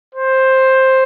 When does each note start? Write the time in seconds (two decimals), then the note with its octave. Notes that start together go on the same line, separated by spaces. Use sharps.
0.15 C5